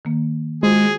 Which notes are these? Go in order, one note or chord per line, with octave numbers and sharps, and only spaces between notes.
D#3 A#3
G#3 F4 F#4 G#4 C5